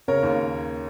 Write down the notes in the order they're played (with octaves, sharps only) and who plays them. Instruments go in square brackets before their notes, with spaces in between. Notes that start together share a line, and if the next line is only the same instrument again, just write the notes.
[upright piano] C#3 A#4 C#5
D#2